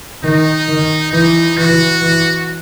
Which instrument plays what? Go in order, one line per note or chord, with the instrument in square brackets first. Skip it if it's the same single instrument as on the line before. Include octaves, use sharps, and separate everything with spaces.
[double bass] D#3 [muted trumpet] D#4
[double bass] D#3
[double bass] E3 [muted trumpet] D#4
[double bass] E3 [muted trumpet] F#4
[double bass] E3